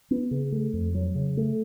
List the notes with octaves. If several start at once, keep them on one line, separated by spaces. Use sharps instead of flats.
B3
C#3
A3
F2
F#3
C#3
A3